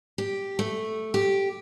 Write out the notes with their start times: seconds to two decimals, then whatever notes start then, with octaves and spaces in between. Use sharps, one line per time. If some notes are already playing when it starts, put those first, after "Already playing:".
0.18 G4
0.59 A3
1.14 G4